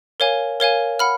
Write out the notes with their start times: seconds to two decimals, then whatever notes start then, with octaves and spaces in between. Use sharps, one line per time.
0.20 A#4 C#5 F5 G#5
0.60 A#4 C#5 F5 G#5
0.99 F#5 B5 F6